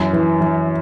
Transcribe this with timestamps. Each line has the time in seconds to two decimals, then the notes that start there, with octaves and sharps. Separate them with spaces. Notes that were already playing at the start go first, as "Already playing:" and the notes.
Already playing: F#2 E3
0.13 E3
0.41 E3